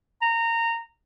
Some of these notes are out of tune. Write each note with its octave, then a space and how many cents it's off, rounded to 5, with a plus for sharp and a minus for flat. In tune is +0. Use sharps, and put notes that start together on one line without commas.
A#5 -20